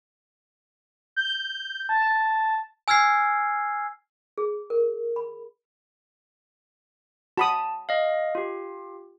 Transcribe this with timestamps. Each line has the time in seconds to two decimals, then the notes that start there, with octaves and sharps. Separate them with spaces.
1.16 G6
1.89 A5
2.88 G#5 E6 F6 G#6 C7
4.38 G#4
4.70 A#4
5.16 B5
7.38 F#4 A5 B5 D#6
7.89 D#5 F5
8.35 F4 G4